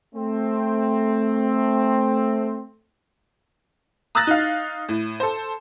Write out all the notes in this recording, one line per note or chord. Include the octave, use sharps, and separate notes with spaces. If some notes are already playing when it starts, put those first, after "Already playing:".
A3 C4
A#5 D#6 E6 F#6 A6 A#6
D#4 F5
A2
A4 C5